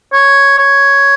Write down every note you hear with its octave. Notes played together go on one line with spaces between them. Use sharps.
C#5
C#5